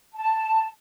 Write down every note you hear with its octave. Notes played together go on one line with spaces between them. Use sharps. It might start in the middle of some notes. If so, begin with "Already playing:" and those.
A5